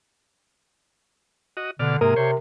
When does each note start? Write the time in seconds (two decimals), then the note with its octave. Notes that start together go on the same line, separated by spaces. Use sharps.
1.57 F#4 D#5
1.79 B2 D3 D5 F6
2.01 G#2 C3 A#3 A#4 D#6
2.16 C3 C5 C#5